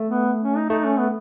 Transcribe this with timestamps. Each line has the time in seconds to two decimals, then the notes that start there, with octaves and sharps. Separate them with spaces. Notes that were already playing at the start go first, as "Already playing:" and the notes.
Already playing: A3
0.09 B3
0.43 C#4
0.56 D#4
0.69 A3 D#4
0.84 C#4
0.98 B3